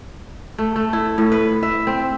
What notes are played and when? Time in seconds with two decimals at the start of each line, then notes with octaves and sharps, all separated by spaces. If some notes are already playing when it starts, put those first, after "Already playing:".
0.58 A3
0.76 A3
0.93 E4
1.18 A2
1.32 B4
1.63 E5
1.87 C4